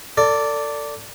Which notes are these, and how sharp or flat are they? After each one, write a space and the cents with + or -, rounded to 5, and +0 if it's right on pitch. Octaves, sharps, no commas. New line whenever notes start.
A4 +35 D5 -10